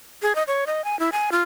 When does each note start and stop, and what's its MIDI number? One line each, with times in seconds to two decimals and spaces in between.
0.22 0.35 68
0.35 0.43 75
0.48 0.65 73
0.67 0.84 75
0.84 0.98 80
1.00 1.10 64
1.12 1.30 80
1.32 1.42 65